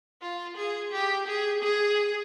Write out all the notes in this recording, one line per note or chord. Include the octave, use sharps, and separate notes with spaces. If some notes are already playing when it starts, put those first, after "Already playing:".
F4
G#4
G4
G#4
G#4